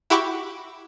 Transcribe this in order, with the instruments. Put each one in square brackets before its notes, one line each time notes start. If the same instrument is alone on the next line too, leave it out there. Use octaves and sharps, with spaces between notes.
[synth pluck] E4 F#4 G4 B5 C#6 D6